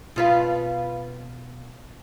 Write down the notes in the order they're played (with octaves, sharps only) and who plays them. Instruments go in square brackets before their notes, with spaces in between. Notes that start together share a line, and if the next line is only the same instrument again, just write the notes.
[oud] B2 F4 B4